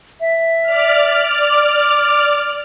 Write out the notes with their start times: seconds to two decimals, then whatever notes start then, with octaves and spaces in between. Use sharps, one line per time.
0.21 E5
0.63 D5 F6
1.49 D6